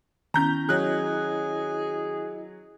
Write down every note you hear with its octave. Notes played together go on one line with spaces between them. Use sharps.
D#3 B3 C#4 E4 A#5 G6
F#3 E4 G#4 D#5 F#6